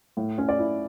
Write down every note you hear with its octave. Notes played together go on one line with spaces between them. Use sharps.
A2
C#4
D5
E4